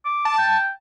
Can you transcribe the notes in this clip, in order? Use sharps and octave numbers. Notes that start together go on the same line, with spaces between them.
D6
A5
G5